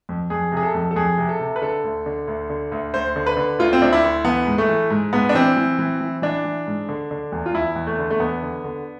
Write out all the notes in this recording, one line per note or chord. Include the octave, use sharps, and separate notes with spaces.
F2
F2 G#4
C3 G#4
A4
F2
A4
F2 G#4
C3
A4
C3
B4
D3 A4
D2
D3
D2
D3
D2
D2 C5
D3
B4
D3
D2 F4
C4
D2 D4
E4
D2
E3 B3
G#2
A3
E3
G#2
G#2 B3
D4
E3 C4
E3
E3
E3
E3 D4
E3
G#2
D3
D3
E2
F4
E2 E4
E2
A3
D3
A3
E2 B3
D3
D3